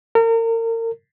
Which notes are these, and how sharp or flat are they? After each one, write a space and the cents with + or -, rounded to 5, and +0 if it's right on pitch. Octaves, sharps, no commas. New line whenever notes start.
A#4 -35